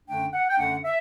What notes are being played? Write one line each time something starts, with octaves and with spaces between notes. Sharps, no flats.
F#2 D3 A3 D4 G5
F#5
G5
F#2 D3 A3 D4 F#5
E5